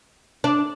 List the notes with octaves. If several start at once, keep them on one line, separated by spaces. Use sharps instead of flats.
D4